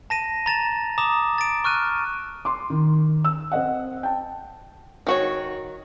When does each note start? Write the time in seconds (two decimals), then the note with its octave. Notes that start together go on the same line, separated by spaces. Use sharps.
0.10 A5 A#6 D#7
0.46 A#5 A6 E7
0.98 A#5 D6 D#6 E7
1.38 A6 D7
1.64 C#6 F6 F#6 D#7
2.45 C6 D6
2.70 D#3
3.25 E6
3.52 C4 D#5 F#5
4.03 G5 A5
5.07 D#3 F#4 C#5